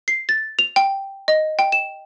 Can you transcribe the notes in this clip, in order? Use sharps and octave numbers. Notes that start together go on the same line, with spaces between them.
C7
A6
F7
G5
D#5
G5
E7